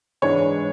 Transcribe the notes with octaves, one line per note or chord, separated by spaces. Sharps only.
G#2 E3 G#3 D4 C#5